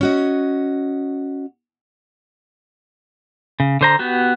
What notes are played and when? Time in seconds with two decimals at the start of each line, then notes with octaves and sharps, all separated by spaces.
0.01 C#4 F#4 D#5
3.60 C#3
3.81 D3 C5 A#5
3.99 B3 F#4 G4